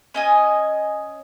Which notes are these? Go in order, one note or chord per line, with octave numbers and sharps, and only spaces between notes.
C#4 D#5 G#5